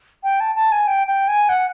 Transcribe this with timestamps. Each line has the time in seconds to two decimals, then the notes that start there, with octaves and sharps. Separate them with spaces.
0.24 G5
0.40 A5
0.55 A5
0.72 G#5
0.87 G5
1.07 G5
1.28 G#5
1.49 F#5